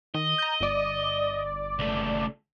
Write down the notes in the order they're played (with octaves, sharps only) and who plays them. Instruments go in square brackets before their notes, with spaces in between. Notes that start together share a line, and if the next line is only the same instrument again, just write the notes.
[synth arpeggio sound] D#3 [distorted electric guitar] D#5
[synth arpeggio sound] A#5 G6
G1 D5
[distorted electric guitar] C#2 A3